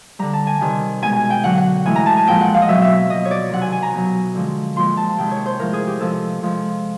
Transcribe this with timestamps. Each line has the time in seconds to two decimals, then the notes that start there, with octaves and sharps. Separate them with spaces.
0.19 D3 G3 A#5
0.33 A5
0.47 G#5
0.61 C3 D#3 G3
1.02 B2 G#3 G#5
1.16 G#5
1.30 G5
1.44 D3 F#3 F#5
1.58 F#5
1.86 A2 E3 G#3 G#5
1.96 A#5
2.06 A5
2.17 G#5
2.27 A#2 F3 G#3 G5
2.41 F#5
2.54 F5
2.62 D#5
2.68 B2 F#3 E5
2.82 E5
3.10 B2 F#3 D#5
3.25 C#5
3.31 D5
3.49 C3 D#3 F#3 F#5
3.61 G#5
3.72 G#5
3.83 A#5
3.93 B2 F#3
4.35 D3 F3 G#3
4.76 A#2 F3 G#3 C6
4.97 A5
5.17 C3 D#3 G#3 G5
5.31 C#5
5.46 C5
5.59 A2 F3 G#3 A#4
5.73 G#4
5.87 G4
6.00 C3 F3 G#3 A4
6.42 C3 F3 G#3